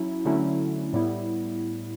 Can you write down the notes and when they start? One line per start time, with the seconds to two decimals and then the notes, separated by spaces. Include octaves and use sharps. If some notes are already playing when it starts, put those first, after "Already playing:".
Already playing: F#3 C#4 E4
0.25 D3 F#3 A3 C#4 E4
0.93 A2 G3 B3 E4